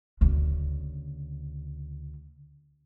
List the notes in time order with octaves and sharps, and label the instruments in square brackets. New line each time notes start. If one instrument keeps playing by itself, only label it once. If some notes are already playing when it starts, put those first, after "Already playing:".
[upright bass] D2 C#3